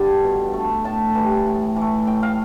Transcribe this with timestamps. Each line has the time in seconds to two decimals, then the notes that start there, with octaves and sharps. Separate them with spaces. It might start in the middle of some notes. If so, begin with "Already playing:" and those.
Already playing: G2 D3 G3 G5 A5
0.24 B2
0.53 A3
0.84 A2 A5
1.15 E3 G3
1.46 A2
1.76 E3
1.81 A3
2.07 A2 G5
2.23 F5